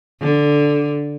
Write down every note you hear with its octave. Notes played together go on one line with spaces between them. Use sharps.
D3